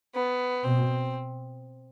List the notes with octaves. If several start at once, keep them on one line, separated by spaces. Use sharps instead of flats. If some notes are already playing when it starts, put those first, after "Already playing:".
B3
B2 C4